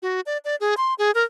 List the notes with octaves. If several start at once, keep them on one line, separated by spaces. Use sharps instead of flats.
F#4
D5
D5
G#4
C6
G#4
A#4